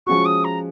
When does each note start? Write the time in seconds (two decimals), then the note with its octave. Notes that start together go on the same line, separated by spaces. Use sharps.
0.07 F3 G#3 C#4 F#4 C#6
0.25 D#6
0.44 A#5